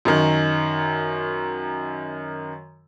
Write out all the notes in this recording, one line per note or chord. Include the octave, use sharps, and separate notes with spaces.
F#2 D#3